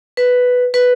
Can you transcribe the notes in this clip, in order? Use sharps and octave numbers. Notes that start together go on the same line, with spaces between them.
B4
B4